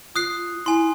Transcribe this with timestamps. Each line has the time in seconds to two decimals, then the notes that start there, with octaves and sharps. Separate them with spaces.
0.16 F4 D#6 F#6 C7
0.66 E4 G#5 C6